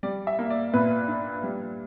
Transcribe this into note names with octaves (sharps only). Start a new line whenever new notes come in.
G3 D5
E5
A#3
D5
A#2 B4
D4
G3